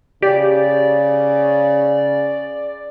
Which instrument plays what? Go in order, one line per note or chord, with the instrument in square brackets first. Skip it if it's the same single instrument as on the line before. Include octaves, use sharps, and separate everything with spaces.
[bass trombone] C#3 [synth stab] G4 [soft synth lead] D5